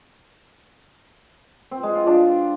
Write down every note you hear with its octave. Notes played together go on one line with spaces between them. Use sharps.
C4
G#3
F4
D4